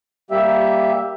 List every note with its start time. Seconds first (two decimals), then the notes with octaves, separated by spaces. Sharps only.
0.31 G3 A#3 G4 E5